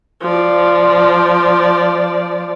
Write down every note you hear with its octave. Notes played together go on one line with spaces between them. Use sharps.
F3 D5